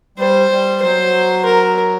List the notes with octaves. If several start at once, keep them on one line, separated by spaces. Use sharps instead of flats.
G3 C5
G3
F#3 C5
A#4